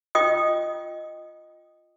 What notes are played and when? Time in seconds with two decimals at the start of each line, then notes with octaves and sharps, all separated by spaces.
0.15 F4 D#5 G5 D#6